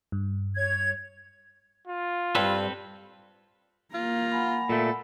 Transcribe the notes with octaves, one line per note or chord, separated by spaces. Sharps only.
G2
C#5 G#6
F4
G2 G3 C4 A4 B4
A#3 F4 A#5
F#5 G#5 B5
A#2 A3 A4